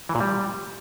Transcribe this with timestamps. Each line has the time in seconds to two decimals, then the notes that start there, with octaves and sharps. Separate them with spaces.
0.09 E3
0.15 A#2
0.20 G3